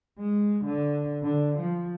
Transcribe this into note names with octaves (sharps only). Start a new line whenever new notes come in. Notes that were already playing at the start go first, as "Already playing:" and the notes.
G#3
D3
D3
F3